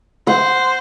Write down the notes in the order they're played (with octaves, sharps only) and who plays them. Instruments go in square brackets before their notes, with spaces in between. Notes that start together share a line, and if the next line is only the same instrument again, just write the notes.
[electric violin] C5 [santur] F#5